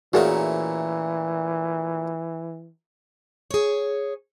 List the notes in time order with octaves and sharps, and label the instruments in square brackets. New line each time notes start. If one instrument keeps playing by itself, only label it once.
[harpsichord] A#2 A3 C#4 [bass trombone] E3 [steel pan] F#4 G#4 A#4
[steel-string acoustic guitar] G#4 C#5